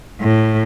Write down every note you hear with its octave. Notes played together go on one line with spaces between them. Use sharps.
A2